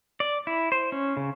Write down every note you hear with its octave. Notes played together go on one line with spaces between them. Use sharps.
D5
E4
C5
C#4
C#3